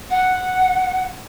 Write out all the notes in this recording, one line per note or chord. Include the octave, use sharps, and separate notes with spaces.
F#5